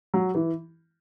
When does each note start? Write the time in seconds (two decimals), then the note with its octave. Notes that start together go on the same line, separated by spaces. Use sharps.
0.14 F#3
0.35 E3